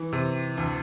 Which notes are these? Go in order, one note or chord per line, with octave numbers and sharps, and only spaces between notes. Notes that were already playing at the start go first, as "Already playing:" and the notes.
Already playing: E3
C3
D2